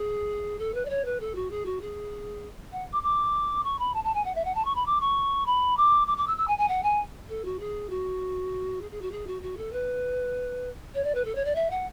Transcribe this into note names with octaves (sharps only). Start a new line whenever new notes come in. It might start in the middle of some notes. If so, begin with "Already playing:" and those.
Already playing: G#4
A4
B4
D5
C#5
B4
A4
F#4
G#4
F#4
G#4
F#5
D6
D6
C#6
B5
A5
A5
G#5
F#5
E5
F#5
A5
C#6
B5
D6
C#6
B5
D6
D6
D6
E6
E6
G#5
G#5
F#5
G#5
A4
F#4
G#4
F#4
G#4
G#4
F#4
G#4
F#4
F#4
A4
B4
C#5
D5
B4
A4
C#5
D5
E5
F#5